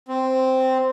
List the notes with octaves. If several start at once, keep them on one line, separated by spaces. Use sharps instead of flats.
C4